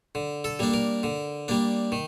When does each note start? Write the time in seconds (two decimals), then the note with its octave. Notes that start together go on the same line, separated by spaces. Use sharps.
0.15 D3
0.44 A4
0.59 G3 A#3 D4
0.74 A#4
1.03 D3
1.48 G3 A#3 D4
1.92 D#3